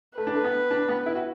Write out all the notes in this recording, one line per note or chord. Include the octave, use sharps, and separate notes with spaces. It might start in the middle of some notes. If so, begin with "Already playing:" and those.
A3 B4
D4
A3
B3
D4
B3
E4
F#4